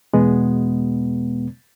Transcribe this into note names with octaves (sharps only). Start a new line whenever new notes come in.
E2 B2 G#3 B3